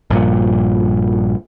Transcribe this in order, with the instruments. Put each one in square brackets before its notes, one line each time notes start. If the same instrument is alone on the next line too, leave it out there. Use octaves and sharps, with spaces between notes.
[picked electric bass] A#1 G2 A#2